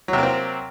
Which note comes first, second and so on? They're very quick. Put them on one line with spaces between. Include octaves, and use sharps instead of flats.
F#3 C3 A#3 C4